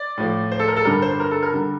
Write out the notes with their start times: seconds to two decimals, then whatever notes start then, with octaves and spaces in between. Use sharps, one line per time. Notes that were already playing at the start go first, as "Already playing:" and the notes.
Already playing: D5
0.18 A2 F3
0.52 C5
0.59 A4
0.68 A#4
0.77 A4
0.85 G2 D3 G3 A#4
1.02 C5
1.20 A#4
1.31 A4
1.43 A#4
1.54 D3 G3